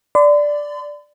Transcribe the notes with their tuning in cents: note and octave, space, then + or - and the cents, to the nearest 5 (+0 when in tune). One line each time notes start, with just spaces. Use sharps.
D5 +0 C6 -45